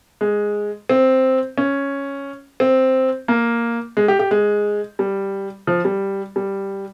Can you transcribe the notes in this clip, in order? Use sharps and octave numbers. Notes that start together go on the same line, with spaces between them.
G#3
C4
C#4
C4
A#3
G#3
G4
G4
G#3
G3
F3
G3
G3